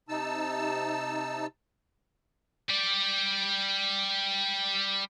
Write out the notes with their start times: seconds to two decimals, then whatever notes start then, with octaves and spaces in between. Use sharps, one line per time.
0.09 C3 D#4 A5 E6
2.69 G3 D5